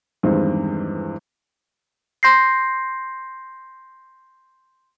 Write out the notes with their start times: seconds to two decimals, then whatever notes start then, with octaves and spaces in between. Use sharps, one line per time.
0.23 E2 G2 D#3 G#3 C4
2.23 C6 G6 A#6 C7